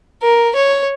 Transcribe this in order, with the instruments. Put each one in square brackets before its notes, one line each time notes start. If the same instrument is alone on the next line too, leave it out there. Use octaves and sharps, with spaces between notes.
[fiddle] A#4
C#5